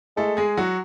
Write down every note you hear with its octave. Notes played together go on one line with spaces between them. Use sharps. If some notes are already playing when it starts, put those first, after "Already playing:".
G#3 A3 A4
G#3 G#4
F#3 F#4